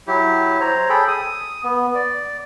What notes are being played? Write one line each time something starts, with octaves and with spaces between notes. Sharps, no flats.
F#3 E4 G4
C5 C#5 A#5
G#4 A4 G5 B5
D#6
B3
D5